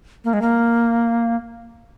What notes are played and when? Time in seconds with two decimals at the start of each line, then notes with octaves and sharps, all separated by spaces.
0.25 A#3
0.33 G#3
0.42 A#3